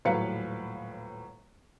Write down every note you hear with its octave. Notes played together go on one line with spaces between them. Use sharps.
D#1 A2 F#3 B4 F5 C#7